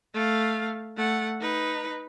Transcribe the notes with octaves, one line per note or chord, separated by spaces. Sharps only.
A3 F5
A3 F#5
D#4 B4